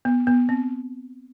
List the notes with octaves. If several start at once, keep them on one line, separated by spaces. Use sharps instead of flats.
B3
B3
C4